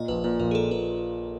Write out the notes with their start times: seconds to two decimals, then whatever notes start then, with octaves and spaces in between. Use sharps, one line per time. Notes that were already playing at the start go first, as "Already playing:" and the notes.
Already playing: A#2 D#5
0.08 A#1 B4
0.24 A#2 B4
0.39 A#1 A#4
0.51 G#4
0.55 F3 A4
0.71 A#2 B4